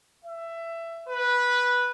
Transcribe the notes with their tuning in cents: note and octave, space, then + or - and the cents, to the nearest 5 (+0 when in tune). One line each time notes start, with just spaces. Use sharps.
E5 +15
B4 -10